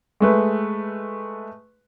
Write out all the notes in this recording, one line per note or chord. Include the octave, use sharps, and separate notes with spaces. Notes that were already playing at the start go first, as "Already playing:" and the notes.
G#3 A3 B4